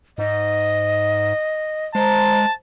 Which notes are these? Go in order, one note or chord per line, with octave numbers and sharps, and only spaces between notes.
G#2 D#5
G#3 C5 A5 A#5